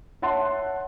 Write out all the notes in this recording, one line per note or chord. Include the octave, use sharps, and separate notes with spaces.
C#5 E5 F#5 A5 C6